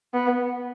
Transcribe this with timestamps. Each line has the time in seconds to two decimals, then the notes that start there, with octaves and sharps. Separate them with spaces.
0.14 B3